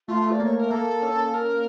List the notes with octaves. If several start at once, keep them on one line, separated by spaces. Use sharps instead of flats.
A3 F4
A3
D5
A#3 C#5
A#4
A#3 A4
C#4
A#4